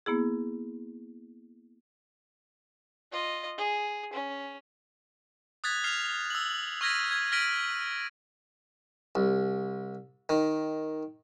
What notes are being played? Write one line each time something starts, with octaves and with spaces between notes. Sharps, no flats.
A#3 B3 E4 G#4
F4 D#5
G#4
C#4
D#6 F#6 G#6 A6 B6
F6 C7 F7
E6 F#7
C#6 F6 G#6 A#6 B6 D#7
G#6
F6 A#6 B6 D7 D#7 F#7
C2
D#3